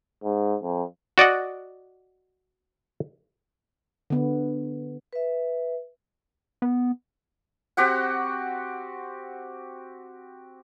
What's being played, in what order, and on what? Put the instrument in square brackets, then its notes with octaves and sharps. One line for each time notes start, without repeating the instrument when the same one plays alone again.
[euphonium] G#2
F2
[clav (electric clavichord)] F#4 D5 D#5 F#5
[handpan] D3 B3
[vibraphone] B4 E5
[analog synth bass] B3
[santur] C4 F#4 G4 F#5